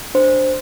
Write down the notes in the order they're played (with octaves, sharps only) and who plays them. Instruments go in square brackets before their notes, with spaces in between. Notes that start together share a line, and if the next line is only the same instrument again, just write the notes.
[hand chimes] D4 C5